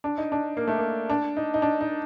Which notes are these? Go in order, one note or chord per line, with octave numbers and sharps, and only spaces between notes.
D4
D#4
D4
A#3
A3
A#3
D4
D#4
D#4
D4
D#4